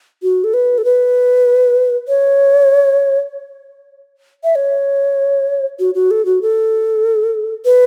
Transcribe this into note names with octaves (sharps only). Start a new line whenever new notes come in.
F#4
A4
B4
A4
B4
C#5
E5
C#5
F#4
F#4
A4
F#4
A4
B4